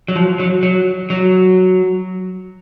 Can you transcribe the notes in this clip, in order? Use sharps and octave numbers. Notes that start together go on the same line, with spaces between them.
F#3
F3
F#3
F#3
F#3